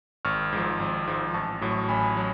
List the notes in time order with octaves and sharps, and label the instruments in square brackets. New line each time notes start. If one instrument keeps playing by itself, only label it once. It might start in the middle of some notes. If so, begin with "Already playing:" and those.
[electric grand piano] G#1 C#6 F6
G#2 F3
G#1
G#2 F3
A1 A5 C#6
A2 F#3
A5 C#6
A1 G#5 B5
F#3